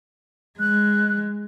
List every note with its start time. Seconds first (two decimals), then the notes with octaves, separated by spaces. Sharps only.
0.60 G#3 F#6